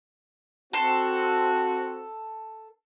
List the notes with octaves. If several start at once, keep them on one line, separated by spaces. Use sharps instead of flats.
C4 F#4 A4 C6